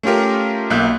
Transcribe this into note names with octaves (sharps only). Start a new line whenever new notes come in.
A3 C#4 F4 G4 A#4
B1 A#3 E5 F#6 G6